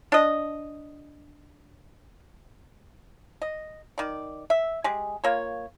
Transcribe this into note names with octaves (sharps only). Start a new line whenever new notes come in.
D4 D#5
D#5
D#3 D5
E5
G#3 G4 G#4
A#3 F4 C#5